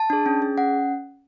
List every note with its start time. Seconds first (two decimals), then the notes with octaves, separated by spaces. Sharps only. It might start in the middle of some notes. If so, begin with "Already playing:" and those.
Already playing: A5
0.10 D4 G#4
0.26 C#4
0.42 G#4
0.58 C#4 F#5